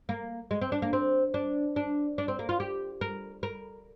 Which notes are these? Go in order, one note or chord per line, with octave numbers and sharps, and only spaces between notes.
A#3
G#3
C4
D4
A#3
C4
D4
D4
D4
C4
A#3
F4
G4
A#4
A#4